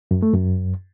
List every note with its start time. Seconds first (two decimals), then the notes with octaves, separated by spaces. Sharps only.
0.11 F#2
0.22 A3
0.34 F#2